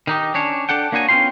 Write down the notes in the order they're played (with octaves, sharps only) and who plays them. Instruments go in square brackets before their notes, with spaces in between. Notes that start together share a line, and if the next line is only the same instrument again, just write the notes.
[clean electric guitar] D#3 D#4 G4
C#4 D4 C#5
D4 A4 F#5 G5
A#3 D4 D#4 F#4 C#5 G#5
B3 C#4 E4 F4 G5 C6